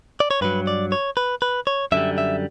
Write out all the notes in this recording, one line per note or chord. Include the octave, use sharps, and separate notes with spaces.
D5
C#5
G2 F#3 B4
D5
C#5
B4
B4
C#5
F#2 D3 G3 E5
E5